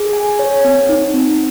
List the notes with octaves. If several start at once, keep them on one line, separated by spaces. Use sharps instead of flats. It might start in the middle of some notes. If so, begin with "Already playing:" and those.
Already playing: G#4
G#5
C#5
C4
D#4
C4